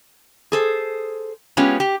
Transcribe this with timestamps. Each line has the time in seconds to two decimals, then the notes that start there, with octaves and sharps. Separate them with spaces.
0.52 G#4 A4 C5
1.57 G#3 B3 C#4 F4 G4
1.80 G4